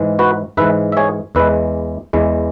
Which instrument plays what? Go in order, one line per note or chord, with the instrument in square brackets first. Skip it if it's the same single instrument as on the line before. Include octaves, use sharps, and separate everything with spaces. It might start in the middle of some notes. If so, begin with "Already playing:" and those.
Already playing: [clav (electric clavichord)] G#2 E3 G#3
F#4 B4
G#2 E3 G#3 B4 E5
E5
G#4 C#5
E2 E3 G#3 B4 E5
E2 E3 G#3